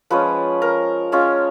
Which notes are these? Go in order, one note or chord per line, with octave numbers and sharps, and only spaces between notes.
F3 G#3 C#4 B4
A#4
G#3 C#4 F4